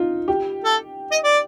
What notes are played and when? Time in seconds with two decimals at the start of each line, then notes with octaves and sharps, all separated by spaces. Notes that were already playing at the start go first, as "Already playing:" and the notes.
Already playing: D#4 F4
0.28 G4
0.64 A4
1.12 D#5
1.24 D5